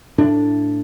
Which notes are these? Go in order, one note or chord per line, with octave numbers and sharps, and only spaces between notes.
A2 D4